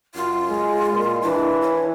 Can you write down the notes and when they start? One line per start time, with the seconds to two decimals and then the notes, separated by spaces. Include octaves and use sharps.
0.15 F#2 F4
0.49 G#3
0.92 A#2
1.22 E3 D4
1.61 C#5